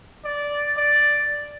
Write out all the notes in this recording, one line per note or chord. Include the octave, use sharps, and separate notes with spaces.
D5
D5